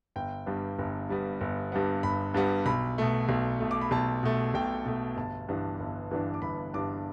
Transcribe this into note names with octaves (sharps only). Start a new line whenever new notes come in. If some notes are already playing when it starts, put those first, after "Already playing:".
G1 G5
G2 G3 B3
G1
G2 G3 B3
G1
G2 G3 B3
G1 B5
G2 G3 B3
B1 B5
B2 A3
B1
B2 A3
D6
B5
B1 A5
B2 A3
B1 G5
B2 A3
G1 A5
G2 E3 B3 D4
G1
G2 E3 B3 D4
D6
G1 B5
G2 E3 B3 D4 D6